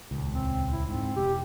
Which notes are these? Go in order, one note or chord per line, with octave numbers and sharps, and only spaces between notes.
D#1 C#2
C4
E4
G#2 C4
E1 G4